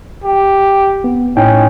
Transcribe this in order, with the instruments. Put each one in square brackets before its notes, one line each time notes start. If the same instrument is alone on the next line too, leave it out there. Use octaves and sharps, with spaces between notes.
[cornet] G4
[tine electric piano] B3
[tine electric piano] A2 D#4 G5 [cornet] C#4